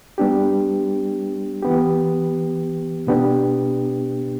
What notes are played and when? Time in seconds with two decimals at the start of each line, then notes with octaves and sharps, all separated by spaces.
0.18 G3 B3 D4 G4
1.62 E3 B3 G4
3.07 B2 B3 D4 G4